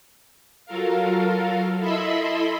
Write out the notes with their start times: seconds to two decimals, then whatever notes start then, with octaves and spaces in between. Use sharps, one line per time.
0.66 F#3 F4 A4 A#4 F5
1.79 E4 A4 D#5 E5 B5 C6